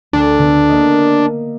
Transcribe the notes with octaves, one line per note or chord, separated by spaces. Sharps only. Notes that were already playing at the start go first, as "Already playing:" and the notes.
D2 D4
D3 B3
A#3 D#5